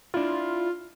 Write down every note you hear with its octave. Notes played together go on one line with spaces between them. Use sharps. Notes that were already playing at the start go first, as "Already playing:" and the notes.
D4 E4 F4